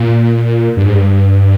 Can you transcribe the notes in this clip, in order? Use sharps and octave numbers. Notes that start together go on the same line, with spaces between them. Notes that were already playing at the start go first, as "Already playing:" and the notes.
Already playing: A#2
G2
G#2
G2